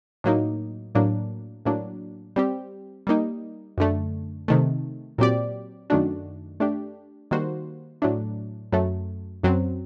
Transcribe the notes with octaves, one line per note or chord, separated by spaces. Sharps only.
A2 F#3 A#3 D#4
A2 F#3 A#3 D4
A2 F#3 A#3 D4
G3 C4 G4
G3 A#3 D#4
F#2 D3 A3
C3 D#3 A3
A#2 F#3 C4 G4 D5
F#2 D#3 A3 D4 F#4
A3 D4 G4
D#3 G3 A#3 F#4 C5
A2 F#3 A3 D4
F#2 F#3 A3
F#2 F#3 C4